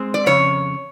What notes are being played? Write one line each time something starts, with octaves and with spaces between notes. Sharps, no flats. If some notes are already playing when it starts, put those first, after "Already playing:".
Already playing: G#3 C4
D5
F2 C#3 C#5